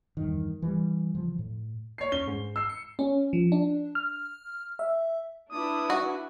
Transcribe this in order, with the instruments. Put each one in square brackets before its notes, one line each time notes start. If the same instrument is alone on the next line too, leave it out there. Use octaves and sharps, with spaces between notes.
[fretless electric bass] E2 G2 D#3
E3 G3
C#3 E3 F3
A2
[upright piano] C#5 C7
[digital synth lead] C#4 [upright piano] G7
[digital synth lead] G#2
[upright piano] E6 C7
[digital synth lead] C#7
[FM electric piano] C#4
F3
D4
F6
E5
[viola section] D4 E4 B4 [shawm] D#6
[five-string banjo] F#4